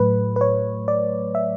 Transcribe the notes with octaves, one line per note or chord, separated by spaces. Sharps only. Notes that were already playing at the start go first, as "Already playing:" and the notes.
Already playing: A2 F#3 A3 B4
B4
C#5
D5
E5